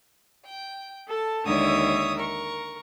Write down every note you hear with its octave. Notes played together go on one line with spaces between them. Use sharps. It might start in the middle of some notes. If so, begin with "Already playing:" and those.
G5
A4 A5
D#2 D3 G#3 C#5 E5 D#6
A#4 C#6